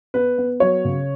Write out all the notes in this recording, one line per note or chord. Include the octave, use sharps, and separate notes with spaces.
B3 B4
B3
F#3 C#5
C#3